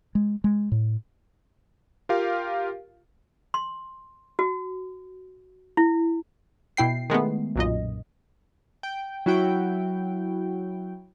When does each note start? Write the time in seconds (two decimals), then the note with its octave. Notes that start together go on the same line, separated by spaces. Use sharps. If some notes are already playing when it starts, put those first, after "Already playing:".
0.15 G#3
0.44 G#3
0.72 A2
2.09 F4 G4 A#4 F5
3.54 C6
4.39 F#4
5.77 E4
6.77 B2 E4 G5 C7
7.10 D#3 G#3 A3 B3
7.56 B1 F#2 A#2 D#5
8.83 G5
9.26 F#3 E4 F#4 G5